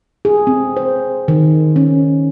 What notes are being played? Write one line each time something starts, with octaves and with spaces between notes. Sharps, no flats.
G#4
C4
C5
D#3
C#4